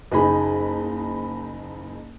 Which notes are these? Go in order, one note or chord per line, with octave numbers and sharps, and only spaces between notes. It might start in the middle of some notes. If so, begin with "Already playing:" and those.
F#1 D#4 G#4 B5